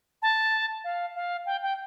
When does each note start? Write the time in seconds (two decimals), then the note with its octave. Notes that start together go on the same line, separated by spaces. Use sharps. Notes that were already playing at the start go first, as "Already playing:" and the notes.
0.22 A5
0.84 F5
1.15 F5
1.46 G5
1.63 G5